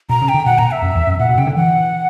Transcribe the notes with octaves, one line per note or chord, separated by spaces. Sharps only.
B2 A#5
C#3
G5
D3
B2 F#5
A#2 A#5
E5
F#2
E2
F#2
A#2 F#5
B2
C#3 G5
D3
E3 F#5